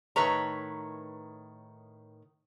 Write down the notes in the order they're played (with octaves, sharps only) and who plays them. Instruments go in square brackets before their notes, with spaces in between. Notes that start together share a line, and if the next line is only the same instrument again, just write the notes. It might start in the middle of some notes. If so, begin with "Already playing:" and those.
[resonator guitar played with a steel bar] A2 D#3 B4 C#5 A#5